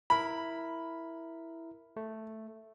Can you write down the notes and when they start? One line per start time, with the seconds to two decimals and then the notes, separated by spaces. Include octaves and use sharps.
0.10 E4 A#4 B5
1.97 A3